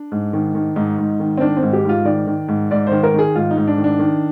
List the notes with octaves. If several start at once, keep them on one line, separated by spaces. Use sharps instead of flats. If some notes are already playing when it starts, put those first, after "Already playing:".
Already playing: D4
G#2
D#3
D#3
G#2 D#4
G#2
D#3
C4
D#3 D4
C4
G#2
G4
G#2 F4
D#3 D5
D#3
G#2
G#2 D5
D#3 C5
A#4
D#3 G#4
G#2 F4
D#4
G#2
D4
D#3
D4
D#3